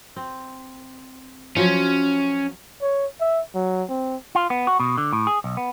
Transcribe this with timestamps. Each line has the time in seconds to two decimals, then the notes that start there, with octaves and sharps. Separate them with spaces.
0.16 C4
1.57 F3 F#3 C#4
2.82 C#5
3.21 E5
3.55 F#3
3.89 C4
4.35 F4
4.50 B3
4.67 F#4
4.80 B2
4.98 D3
5.13 A2
5.27 G#4
5.44 B1
5.57 B3